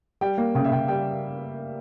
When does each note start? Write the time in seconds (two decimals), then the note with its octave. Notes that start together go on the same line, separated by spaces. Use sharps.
0.21 G3 G5
0.38 A#3
0.55 C#3 G5
0.64 E5
0.71 C#3 G5
0.88 G3 G5